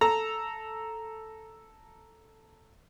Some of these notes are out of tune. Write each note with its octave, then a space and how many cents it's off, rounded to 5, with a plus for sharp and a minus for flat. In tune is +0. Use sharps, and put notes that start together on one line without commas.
A4 +0 A#5 -5